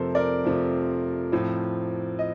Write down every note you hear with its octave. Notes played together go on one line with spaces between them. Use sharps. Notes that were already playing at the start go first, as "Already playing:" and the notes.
Already playing: F2 C3 F3 A3 A4 A#4 C5
A#4 D5
F2 C3 F3 A3
A2 F3 C4
D#5